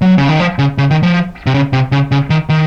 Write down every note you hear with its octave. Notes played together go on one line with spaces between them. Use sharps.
F#3
C#3
D#3
F3
C#3
C#3
D#3
F3
C3
C#3
C3
C#3
C#3
D#3
D#3